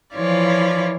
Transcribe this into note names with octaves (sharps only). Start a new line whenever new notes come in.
E3 F3 E4 F4 C#5 D5